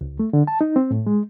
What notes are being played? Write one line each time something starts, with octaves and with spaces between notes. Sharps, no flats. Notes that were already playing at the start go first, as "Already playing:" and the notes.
C#2
A3
D3
A5
D#4
C4
A2
G#3